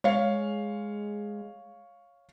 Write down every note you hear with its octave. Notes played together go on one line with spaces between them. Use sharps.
G#3 C#5 F5